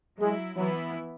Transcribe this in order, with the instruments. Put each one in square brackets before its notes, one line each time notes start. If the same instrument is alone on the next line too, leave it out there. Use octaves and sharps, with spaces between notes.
[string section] F#3 E4 [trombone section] G#3
[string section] E3 B3 E4 [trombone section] F#3